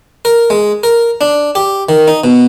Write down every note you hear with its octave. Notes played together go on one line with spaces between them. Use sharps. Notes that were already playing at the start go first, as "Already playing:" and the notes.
A#4
G#3
A#4
D4
G4
D#3
D#4
B2